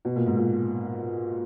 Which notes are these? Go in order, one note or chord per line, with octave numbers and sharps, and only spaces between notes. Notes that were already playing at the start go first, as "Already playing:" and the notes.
B2
A#2
G#2
A#2